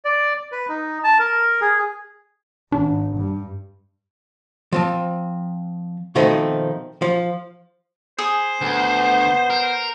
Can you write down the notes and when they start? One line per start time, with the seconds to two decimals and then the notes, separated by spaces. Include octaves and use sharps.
0.05 D5
0.52 B4
0.69 D#4
1.04 A5
1.19 A#4
1.61 G#4
2.72 G#1 D4
3.17 G2
4.72 F3 C4 A5
6.15 B2 D#3 F3 A3 C4 D#4
7.02 F3
8.19 G#4 C5
8.61 D2 B3
9.50 A#4